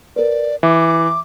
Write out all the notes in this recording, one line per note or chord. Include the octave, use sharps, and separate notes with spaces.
A#4 B4 D5
E3 E5 D6